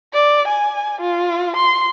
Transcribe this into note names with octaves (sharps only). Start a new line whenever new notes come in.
D5
G#5
F4
C6